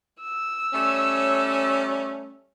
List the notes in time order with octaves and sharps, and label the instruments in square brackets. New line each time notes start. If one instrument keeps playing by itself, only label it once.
[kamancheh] E6
[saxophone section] G3 A3 C#4